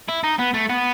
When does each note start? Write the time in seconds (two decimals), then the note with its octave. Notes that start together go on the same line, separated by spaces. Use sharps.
0.09 E4
0.24 D#4
0.39 B3
0.54 A3
0.70 B3